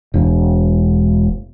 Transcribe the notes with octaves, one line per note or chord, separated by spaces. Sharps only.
E1